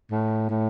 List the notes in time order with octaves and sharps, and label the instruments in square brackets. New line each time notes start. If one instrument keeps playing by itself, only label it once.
[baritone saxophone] A2
A2